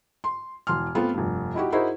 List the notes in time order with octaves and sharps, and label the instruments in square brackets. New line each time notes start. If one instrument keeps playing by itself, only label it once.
[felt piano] C6
E1 C6 F6
A3 B3 C4 F4
F1 G2
D#4 E4 F#4 G4
D#4 E4 F#4 G#4 A#4 C5